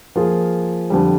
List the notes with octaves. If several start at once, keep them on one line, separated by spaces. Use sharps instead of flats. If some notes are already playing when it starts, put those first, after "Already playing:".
F3 A#3 F4 G#4
F2 D3 G3